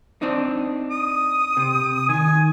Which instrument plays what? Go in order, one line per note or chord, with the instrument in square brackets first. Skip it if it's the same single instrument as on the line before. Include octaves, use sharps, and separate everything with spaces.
[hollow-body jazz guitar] C4 D4 D#4
[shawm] D#6
[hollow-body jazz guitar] C3
[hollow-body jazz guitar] D#3 [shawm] G#5